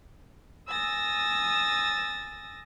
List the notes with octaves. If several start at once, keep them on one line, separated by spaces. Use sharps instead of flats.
G#5 D#6 E6 A6 A#6